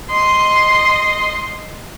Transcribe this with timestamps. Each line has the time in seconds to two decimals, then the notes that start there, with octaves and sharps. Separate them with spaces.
0.10 D#5 C6